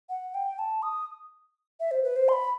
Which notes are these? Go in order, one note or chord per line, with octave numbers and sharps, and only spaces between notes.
F#5
G5
A5
D#6
E5
C5
B4
C5
C6
B5